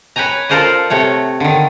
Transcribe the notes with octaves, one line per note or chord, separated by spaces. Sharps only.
B4 C#5 G5 G#5 A#5
F4 A4 A#4 C5 D5 D#5
C3 A3 C#5 F#5
D3 D#3